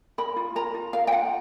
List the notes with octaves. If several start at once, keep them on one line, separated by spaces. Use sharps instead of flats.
A#4 B5
F4
A#4 A#5
F4
A#4 F5
G5
F4 F#5